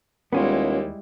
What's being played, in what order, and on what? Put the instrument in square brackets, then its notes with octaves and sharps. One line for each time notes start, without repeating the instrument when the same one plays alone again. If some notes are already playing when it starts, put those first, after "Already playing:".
[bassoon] D#2 [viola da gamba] G3 G#3 E4 [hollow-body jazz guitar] B3 C#4 F4